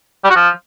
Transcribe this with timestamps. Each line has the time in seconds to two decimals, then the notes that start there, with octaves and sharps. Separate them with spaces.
0.25 G3
0.30 F#4
0.36 F3